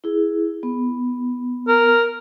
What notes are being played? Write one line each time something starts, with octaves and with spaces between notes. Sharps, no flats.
E4 G#4
B3
A#4